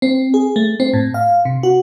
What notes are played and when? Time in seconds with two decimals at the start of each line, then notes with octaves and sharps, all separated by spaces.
0.02 C4
0.34 G#4
0.56 A3
0.80 C4
0.93 A2
1.14 F5
1.45 C3
1.63 F#4